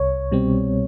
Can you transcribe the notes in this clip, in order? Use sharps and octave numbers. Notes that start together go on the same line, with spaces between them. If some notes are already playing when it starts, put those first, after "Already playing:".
Already playing: C2 C#5
B2 G3 C4